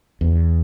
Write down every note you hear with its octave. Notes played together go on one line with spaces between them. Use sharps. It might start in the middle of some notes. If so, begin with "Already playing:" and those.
E2